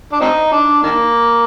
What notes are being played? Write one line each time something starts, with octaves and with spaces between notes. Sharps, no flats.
D4
C4 D#4
D4
D#3 A#3